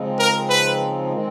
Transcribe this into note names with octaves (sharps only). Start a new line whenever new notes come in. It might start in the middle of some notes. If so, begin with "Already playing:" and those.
Already playing: C#3 F3 G#3 C4 D#4
A#4
B4
D#3 G#3 C4